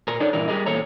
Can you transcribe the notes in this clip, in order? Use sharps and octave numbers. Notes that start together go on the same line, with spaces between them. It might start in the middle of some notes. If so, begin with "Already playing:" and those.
A#2 A#4
D4 D#4 A4 C#5 D5
G2 A#2 E3 E4 A#4
G3 G4 G#4 A#4 D#5
E2 A#2 A4 C#5 A#5